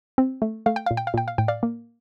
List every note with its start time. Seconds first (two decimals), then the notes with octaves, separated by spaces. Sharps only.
0.18 C4
0.42 A3
0.66 A3 F5
0.76 G5
0.86 A#2 F5
0.97 G5
1.07 F5
1.14 A#2 G5
1.28 F5
1.38 A2 G5
1.48 D5 F5
1.63 A#3